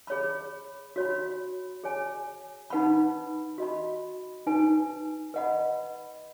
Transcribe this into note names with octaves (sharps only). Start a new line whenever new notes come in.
G#4 C#5 B5
F#4 C#5 B5
G#4 C#5 G#5
D#4 B4 F#5 B5
F#4 D#5 B5
D#4 B4 G#5
B4 D#5 F#5 B5